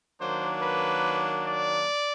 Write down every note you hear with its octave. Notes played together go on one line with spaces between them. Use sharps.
D#3 F#3 A#3 D4 C5
B4
D5